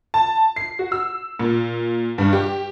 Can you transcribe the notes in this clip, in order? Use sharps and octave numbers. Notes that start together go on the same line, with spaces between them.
A5
C7
F#4
E6
A#2
G2
G4